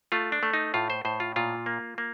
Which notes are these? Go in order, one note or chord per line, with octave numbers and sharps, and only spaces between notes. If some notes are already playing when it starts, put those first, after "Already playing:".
A3 F4
D4
A3
D#4
A2 F4
C5
A2 C5
F4
A#2 F4
A#3
A#3